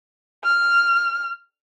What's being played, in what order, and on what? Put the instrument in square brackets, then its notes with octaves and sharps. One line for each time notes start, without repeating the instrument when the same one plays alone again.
[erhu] F6